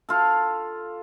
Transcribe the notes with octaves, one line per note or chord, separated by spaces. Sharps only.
F4 A4